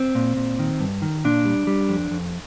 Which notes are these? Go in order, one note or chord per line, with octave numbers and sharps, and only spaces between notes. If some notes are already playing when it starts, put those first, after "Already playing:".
Already playing: C4
A#2
A#2
D#3
G2
D#3
A#2 D4
G3
G3
F2
F2